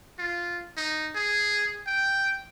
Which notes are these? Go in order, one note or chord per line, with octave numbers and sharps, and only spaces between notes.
F4
D#4
G#4
G5